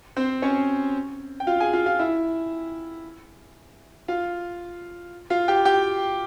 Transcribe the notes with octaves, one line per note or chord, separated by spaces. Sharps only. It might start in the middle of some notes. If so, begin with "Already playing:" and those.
C4 C5
C#4 C#5
G5
F4 F5
G#4 G#5
F4 F5
F4 F5
E4 E5
F4 F5
F4 F5
G4 G5
G4 G5